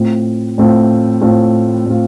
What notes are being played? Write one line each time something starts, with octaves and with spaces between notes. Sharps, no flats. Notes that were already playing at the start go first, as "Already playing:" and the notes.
Already playing: A2 A3 C4 F4
A2 A3 C4 F4
A2 A3 C4 F4
A2 A3 C4 F4